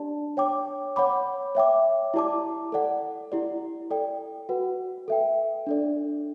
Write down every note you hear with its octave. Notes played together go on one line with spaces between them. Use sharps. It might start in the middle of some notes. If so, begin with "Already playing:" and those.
Already playing: D4 G4 D5 A5
C#5 G5 D6
C#5 F#5 B5 D6
C#5 E5 G5 D6
E4 G4 D5 A5 D6
A4 D5 F#5
E4 G4 D5
A4 D5 G5
F#4 B4 F#5
A4 E5 G5
D4 A4 D5